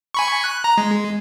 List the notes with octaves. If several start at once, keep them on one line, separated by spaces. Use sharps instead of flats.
G#5 B5 C#6
F#6
A#5
G#3